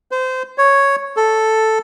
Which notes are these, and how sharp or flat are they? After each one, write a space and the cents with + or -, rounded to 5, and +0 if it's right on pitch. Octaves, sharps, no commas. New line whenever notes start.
C5 -25
C#5 +0
A4 +0